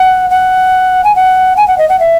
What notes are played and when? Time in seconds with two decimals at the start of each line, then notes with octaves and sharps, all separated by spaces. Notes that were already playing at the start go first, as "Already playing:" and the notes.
Already playing: F#5
0.30 F#5
1.04 G#5
1.16 F#5
1.57 G#5
1.68 F#5
1.78 D#5
1.89 F#5
2.00 E5